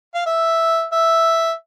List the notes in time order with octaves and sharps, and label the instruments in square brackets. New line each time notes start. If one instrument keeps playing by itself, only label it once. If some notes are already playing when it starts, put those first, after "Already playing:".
[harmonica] F5
E5
E5